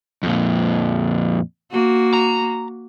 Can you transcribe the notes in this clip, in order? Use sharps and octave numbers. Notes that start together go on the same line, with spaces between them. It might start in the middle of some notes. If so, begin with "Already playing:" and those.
F2 A#2
A#3 F#4
A#5